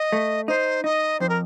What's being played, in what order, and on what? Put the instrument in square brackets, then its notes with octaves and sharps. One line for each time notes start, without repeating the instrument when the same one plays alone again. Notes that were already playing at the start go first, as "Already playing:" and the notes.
Already playing: [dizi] D#5
[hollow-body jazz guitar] A3
[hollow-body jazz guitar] D#4 [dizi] C5
[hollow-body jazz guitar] D#4 [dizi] D#5
[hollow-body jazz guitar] F2 [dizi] C5
[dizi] A#4